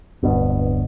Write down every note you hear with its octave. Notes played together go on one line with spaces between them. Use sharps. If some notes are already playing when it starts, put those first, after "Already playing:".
D1 G2 B2